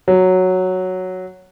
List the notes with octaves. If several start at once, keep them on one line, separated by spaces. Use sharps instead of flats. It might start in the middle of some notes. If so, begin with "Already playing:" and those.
F#3